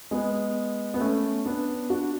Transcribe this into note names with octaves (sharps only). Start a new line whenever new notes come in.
G#3 B3
B3
A3 C#4
B3 D4
D4 F#4